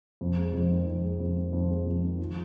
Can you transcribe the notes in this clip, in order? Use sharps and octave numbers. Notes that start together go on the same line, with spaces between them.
F2
G#3
F2
D#3
F2
G#3
F2
D#3
F2
G#3
F2
D#3
F4